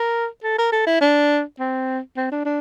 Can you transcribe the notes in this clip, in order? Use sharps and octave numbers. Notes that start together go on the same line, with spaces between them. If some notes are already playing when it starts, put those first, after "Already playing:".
Already playing: A#4
A4
A#4
A4
E4
D4
C4
C4
D4
D4